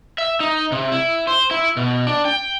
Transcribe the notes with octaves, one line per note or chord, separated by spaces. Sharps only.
E5
D#4
C3
E4
C5
E4
B2
D4
G5